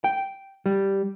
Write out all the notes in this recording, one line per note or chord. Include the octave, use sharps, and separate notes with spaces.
G5
G3